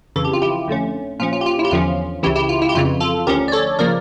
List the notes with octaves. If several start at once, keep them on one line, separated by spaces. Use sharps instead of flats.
F2 C#3 E3 A4
G4
F4
E4 G4
F2 D3 A3 C#4
A#2 F3 C#4 F4
F4
G4
F4
E4
G4
E2 D3 F3 C#4 F4
C#2 C#3 E3 E4 G4
E4 G4
F4
E4
G4
F2 C#3 E3 F4
F4 A4
D2 D3 F3 C#4 G4 A#4
D5
A4 C#5
C#3 F3 A#3 A#4 D5